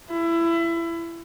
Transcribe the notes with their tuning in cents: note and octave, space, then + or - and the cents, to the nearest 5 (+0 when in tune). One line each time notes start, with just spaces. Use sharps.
E4 +25